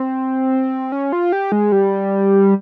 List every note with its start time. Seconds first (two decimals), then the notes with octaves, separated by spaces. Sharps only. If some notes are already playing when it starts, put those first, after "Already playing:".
Already playing: C4
0.92 C#4
1.12 F4
1.32 G4
1.52 G#3
1.72 G3